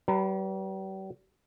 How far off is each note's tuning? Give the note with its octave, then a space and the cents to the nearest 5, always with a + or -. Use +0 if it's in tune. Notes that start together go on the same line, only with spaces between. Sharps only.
G3 -40 B4 +0 A#5 -20